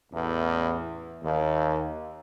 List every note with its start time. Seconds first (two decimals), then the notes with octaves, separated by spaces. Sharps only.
0.12 A1 E2
1.23 D#2